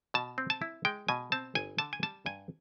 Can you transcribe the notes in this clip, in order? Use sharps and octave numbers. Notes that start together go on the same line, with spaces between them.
B2 A5
C4
A5
E4
G#3 G5
B2 G#5
C4 A5
G1 G#5
D3 A5
G#5
G3 A5
G2 G#5